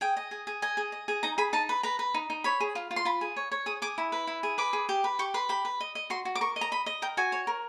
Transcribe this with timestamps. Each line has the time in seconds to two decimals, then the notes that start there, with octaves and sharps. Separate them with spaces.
0.01 G#4 G5
0.17 D#5
0.31 G#4
0.47 G#4
0.62 D#5 G#5
0.77 G#4
0.92 D#5
1.08 G#4
1.23 D#4 A#5
1.38 G#4 B5
1.53 D#4 A5
1.69 B4
1.83 B4 A#5
1.99 B4
2.14 D#4
2.30 D#4
2.44 C#5 B5
2.60 G#4
2.75 F4
2.91 F4
2.96 C6
3.05 F4 B5
3.21 G#4
3.36 C#5
3.51 C#5
3.66 G#4 D#6
3.82 G#4 D6
3.98 E4
4.12 B4
4.27 E4
4.43 G#4
4.58 B4 D6
4.73 G#4
4.89 G4
5.04 B4
5.19 G4 C#6
5.34 B4 C6
5.49 G4 B5
5.65 B4
5.80 D#5
5.95 D#5
6.10 F#4 C6
6.25 F#4
6.35 D6
6.41 A#4 C#6
6.56 D#5
6.61 A#5
6.72 D#5 B5
6.86 D#5
7.02 A#4 G5
7.17 F#4 G#5
7.32 C#5
7.47 A#4